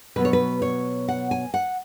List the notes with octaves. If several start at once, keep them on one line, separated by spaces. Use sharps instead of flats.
B2 F#3 B3 B4
C#5
B4
C#5
F#5
G#5
F#5